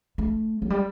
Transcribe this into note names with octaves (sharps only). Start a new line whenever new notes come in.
A3
F#3
G3